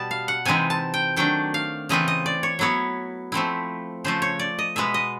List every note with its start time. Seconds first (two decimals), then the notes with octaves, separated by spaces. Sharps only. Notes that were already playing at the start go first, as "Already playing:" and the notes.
Already playing: B2 G3 B3 A5
0.11 F5
0.28 F#5
0.45 C3 E3 G#3 C4 D#4 G#5
0.70 A5
0.94 G5
1.16 D#3 F#3 A3 D4 G5
1.54 F5
1.89 C#3 E3 A3 C4 F4 D#5
2.08 D#5
2.26 D5
2.43 C#5
2.59 F#3 B3 E4 C#5
3.32 F3 A3 C4 E4
4.04 C#3 F3 A3 C5
4.22 C#5
4.39 D5
4.59 D#5
4.76 B2 G#3 B3 E5
4.94 D#5